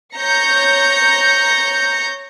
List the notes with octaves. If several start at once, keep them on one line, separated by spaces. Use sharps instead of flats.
C#5 A#5 G6 A#6 C#7